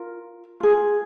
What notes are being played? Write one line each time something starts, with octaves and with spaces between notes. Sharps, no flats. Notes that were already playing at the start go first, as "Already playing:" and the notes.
Already playing: F4 A#4
F4 G#4